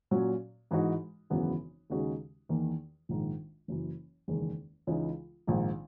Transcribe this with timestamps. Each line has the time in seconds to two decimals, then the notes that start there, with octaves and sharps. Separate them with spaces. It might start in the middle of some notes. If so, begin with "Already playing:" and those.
0.11 A#2 F#3 C#4 F#4
0.71 G#2 E3 G#3 D#4 F#4
1.30 G#1 F#2 C#3 E3 B3
1.90 D#2 C#3 G#3 D#4 F#4
2.49 E2 D#3 A#3
3.09 A#1 G#2 D#3
3.68 F#1 F#2 E3
4.28 F#1 E2 D#3 G#3
4.87 C#2 C#3 E3 G#3 D#4
5.47 A#1 G#2 D#3